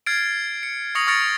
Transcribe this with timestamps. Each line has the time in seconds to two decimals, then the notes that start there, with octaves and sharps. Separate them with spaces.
0.06 F6 G#6 A6 C7 D7
0.63 C#7
0.95 C#6 D#6 A#6 C#7 F7 F#7
1.07 C#6 F6 A6 A#6 C#7 D7